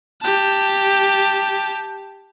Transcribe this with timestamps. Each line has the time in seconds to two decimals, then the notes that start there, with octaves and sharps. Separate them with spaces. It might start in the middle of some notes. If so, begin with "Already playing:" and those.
0.21 G4 A5